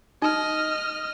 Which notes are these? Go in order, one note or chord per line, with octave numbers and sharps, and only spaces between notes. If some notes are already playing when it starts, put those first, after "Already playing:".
D#4 D#5 F6